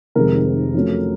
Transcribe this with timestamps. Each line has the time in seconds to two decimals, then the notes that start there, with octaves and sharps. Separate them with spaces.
0.15 F1 F2 C3 D#3 G#3 A#4
0.74 F2 C#3 F#3 A3 C#4